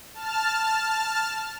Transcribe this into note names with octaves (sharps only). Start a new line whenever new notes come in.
A5 F6